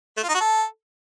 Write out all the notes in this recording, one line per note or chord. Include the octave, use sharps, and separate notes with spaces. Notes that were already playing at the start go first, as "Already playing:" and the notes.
A3
F4
D#4
F#4
A4